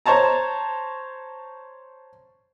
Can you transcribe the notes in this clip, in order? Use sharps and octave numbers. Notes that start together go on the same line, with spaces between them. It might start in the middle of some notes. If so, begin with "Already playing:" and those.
C5 C#5 A5 A#5